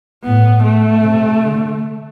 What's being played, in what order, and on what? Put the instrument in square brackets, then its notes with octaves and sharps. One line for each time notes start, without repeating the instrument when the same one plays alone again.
[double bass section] A2 [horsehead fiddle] B3
[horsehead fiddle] A3
[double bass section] C3
D3